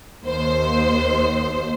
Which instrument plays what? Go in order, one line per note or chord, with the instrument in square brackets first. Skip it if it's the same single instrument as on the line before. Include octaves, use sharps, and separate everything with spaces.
[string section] D#2 C5